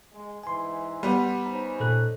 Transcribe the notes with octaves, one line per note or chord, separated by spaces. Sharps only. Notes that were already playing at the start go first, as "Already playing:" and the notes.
G#3
G#2 E3 G#5 C6
G3 B3
C#4 D#4 C5 A#5
A#2 A4 F#6